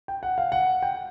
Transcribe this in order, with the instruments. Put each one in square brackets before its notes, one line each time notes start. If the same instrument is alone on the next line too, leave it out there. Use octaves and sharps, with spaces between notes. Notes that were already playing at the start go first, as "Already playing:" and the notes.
[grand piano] G5
F#5
F5
F#5
G5